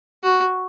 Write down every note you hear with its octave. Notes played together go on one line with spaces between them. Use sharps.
F#4